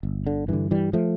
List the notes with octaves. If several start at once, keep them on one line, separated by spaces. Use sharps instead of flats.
G1
D3
G2 D3 E3
E3 G3
F3 A3